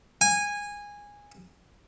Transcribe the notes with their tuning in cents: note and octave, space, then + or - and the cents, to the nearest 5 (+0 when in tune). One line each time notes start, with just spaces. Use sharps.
G#5 -15